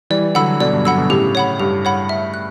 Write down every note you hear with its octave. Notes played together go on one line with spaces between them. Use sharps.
E3 G3 D5
D3 F#3 F#5 B5 E6
B2 D3 D5
G2
D3 F#3 F#5 B5 E6
B2 D3
A2 C#3 G4
C#5 F#5 B5
G2 G4
C#5 F#5 B5
E5
F#6